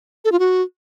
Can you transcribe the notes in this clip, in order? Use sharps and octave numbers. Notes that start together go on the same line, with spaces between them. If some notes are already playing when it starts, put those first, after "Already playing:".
A4
F4
F#4